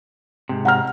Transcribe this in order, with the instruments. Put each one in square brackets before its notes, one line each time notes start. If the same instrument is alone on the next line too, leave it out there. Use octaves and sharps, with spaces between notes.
[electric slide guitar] G#2 C3
[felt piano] F#5 A#5 F6